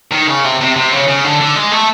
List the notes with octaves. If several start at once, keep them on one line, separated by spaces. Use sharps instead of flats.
D#3
C#3
C3
C3
C3
C#3
C#3
D3
D3
G#3
A3